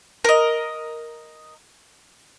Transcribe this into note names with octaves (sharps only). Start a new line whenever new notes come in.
A#4 D#5